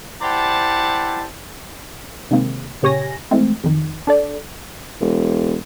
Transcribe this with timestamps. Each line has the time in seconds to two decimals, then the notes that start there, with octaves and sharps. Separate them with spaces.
0.22 E4 G4 C5 D5 F#5 A5
2.31 C3 D#3 G#3 A#3 C4
2.82 A#2 C#3 G4 C#5 G#5 A#6
3.31 E3 G#3 A3 C4
3.64 F2 D#3
4.07 D4 A4 D5
5.00 E1